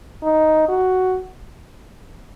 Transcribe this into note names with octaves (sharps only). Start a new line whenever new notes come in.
D#4
F#4